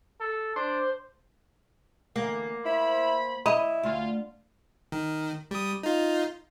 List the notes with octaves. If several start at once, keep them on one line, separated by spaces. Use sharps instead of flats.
A4
D4 C5
D3 E3 A#3
E4 C5 B5
E4 D#5 B5
D2 F4
D#3
G3 D#6
D#4 F4